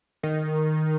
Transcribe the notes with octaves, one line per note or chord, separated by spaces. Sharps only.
D#3